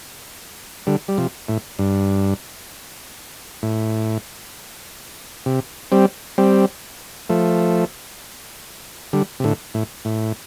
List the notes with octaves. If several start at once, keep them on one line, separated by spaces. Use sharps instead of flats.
D3 G3
G3
C3 F3
A2
G2
A2
C3
G3 C4
G3 C4
F3 A3
D3 G3
C3
A2 D3
A2
A2